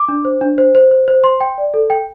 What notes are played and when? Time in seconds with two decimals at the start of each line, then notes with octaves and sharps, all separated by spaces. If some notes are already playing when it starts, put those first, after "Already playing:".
Already playing: D6
0.08 D4
0.25 C5
0.41 D4
0.58 C5
0.75 C5
0.91 C5
1.08 C5
1.24 C6
1.40 G5
1.58 D5
1.74 A4
1.90 G5